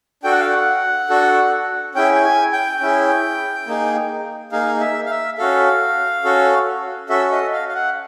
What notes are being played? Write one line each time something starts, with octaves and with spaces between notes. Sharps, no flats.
D4 F#4 A4 G5
F#5
F5
F#5
D4 F#4 A4
C#4 E4 G#4 G5
G5
G#5
G5
C#4 E4 G#4
A#3 D#4 G#4
A#3 D#4 G#4 F5
E5
F5
E5
C#4 F#4 A4 F5
C#4 F#4 A4
C#4 F#4 A4 E5
D#5
F5
F5
F#5